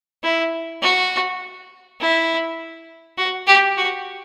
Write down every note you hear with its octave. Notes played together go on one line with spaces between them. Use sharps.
E4
F#4
E4
F#4
G4
F#4